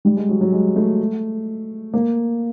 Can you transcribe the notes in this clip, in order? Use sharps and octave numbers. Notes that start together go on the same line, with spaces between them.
G3
G#3
F#3
F#3
G#3
A3
A#3